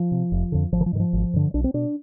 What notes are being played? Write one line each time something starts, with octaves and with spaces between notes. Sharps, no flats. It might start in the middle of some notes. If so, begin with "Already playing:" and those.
Already playing: F3
C3
F1
F2 D3
G#1 F3
D#3
F3
G#2 D#3
F3
G#1
G2 D3
B1 D4
C4
B2 D4